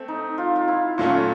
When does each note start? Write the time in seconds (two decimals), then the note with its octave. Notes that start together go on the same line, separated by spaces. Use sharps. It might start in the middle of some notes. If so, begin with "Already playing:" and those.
Already playing: A3 C4
0.08 D#4
0.38 F4
0.56 F4
0.68 E4
0.98 A#2 F#3 A3 C#4 F4